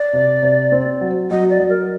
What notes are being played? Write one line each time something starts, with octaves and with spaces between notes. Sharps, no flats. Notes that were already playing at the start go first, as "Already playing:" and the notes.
Already playing: D5
C3
C3
C4
F#3
F#3 D#5
D5
F#3
A#4